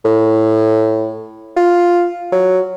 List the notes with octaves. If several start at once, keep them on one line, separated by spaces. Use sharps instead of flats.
A2
F4
F#3